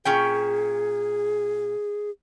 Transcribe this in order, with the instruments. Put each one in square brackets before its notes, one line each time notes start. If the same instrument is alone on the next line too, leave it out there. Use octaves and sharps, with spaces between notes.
[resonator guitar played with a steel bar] A#2 C#4 G5 [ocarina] G#4